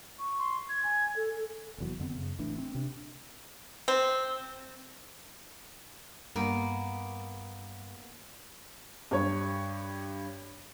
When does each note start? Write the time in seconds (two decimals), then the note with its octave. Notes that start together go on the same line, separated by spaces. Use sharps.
0.19 C#6
0.39 C6
0.69 G#6
0.84 G#5
1.16 A4
1.35 A4
1.78 F1 E2 F#3
2.00 F2 D3 B3 C4
2.15 F#2 C#3
2.39 A1 E3 A3 D4
2.58 C4
2.75 C3 D4
3.88 C4
6.36 G2 A#3 B3
9.11 G2 C#5